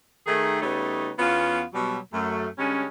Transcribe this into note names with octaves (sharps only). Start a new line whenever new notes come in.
D#3 A3 G#4
C#3 G3 A3 B3 D#4 C#5
E2 B3 C#4 F4
B2 F#3 G3
F#2 A3
D3 G3 G#3 C#4